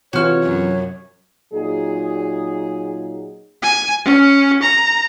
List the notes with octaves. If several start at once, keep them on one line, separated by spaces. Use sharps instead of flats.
C3 E3 F4 F#4 C#5 F6
F#2
A#2 F#3 D#4 G#4
G#5
C#4
A#5